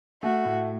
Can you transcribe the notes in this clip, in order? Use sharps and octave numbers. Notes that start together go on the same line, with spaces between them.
A3 F#4
A2